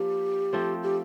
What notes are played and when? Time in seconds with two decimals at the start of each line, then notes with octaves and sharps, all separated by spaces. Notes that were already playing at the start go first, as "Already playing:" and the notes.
Already playing: F3 A#3 G4
0.53 F3 A3 C4
0.83 G4